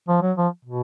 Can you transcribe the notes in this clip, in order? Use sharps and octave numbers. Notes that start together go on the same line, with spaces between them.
F3
F#3
F3
B2